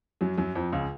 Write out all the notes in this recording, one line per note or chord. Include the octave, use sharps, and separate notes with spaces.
F#2 F#3
F#2 F#3
F2 F3
C#2 C#3